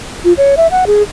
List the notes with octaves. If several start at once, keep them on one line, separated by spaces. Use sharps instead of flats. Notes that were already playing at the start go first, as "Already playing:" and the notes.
F4
C#5
E5
F#5
G#4